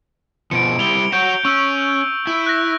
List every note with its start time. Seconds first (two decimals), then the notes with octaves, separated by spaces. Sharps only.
0.51 B2 F3 C#7 D7
0.79 G3 E4 F7 G7
1.12 F#4 C#5 G6 D7
1.45 C#4 C#6 E6
2.27 E4
2.46 F#6 A#6